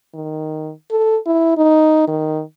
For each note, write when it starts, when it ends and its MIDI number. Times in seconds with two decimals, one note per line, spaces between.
0.14 0.72 51
0.91 1.17 69
1.27 1.53 64
1.57 2.07 63
2.08 2.41 51